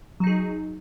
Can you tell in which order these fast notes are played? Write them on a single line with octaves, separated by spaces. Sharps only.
F#3 D#4 G#4